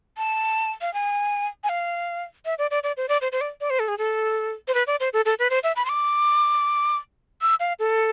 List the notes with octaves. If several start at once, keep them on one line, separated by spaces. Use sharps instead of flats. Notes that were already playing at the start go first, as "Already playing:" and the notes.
A5
F5
G#5
G#5
F5
E5
D5
D5
D5
C5
D5
C5
C5
D5
D5
C5
A4
G#4
A4
C5
B4
D5
C5
A4
A4
B4
C5
E5
B5
C6
D6
E6
F5
A4